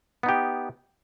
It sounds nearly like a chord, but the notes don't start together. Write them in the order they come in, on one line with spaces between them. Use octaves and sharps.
B3 D#4 G4